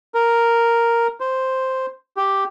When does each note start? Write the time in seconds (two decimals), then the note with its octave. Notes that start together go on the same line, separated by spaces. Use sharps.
0.14 A#4
1.20 C5
2.17 G4